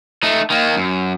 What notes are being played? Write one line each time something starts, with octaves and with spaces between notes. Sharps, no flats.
A3 D#4
D#3 A#3
F#2